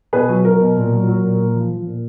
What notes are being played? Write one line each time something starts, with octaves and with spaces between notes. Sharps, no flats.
B2 G#4 B4
F#3
F#3 A#4
B2
A#2
F#3
F#3
A#2
A#2
F3
F3
A#2